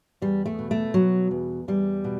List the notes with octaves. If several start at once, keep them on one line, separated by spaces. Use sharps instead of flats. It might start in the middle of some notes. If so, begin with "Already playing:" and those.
E2 G3
A3
B2
A3
B2 F#3
E2
E2 G3
B2